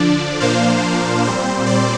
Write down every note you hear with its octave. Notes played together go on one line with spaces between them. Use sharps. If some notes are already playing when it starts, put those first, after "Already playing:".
Already playing: D3 F3 D4 D5
A#2 F3 A#3 D4 C5 F5
A#2 G3 C4 C5
D5